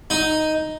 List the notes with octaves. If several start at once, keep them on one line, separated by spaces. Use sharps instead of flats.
D#4